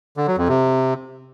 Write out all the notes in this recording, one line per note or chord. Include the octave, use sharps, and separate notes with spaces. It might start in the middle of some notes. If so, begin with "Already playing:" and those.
D3
F#3
F2
C3